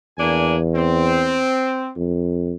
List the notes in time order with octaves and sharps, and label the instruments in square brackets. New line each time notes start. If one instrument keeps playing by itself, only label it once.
[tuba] E2 [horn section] A#3 D4 G#5
[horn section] C4
[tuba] F2